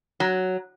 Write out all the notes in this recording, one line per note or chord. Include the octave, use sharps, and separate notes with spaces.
F#3